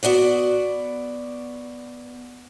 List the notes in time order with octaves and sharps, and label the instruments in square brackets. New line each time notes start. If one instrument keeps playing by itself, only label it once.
[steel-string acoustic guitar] B3 F#4 D5 F#5